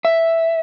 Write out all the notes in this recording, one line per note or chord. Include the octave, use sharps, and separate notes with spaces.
E5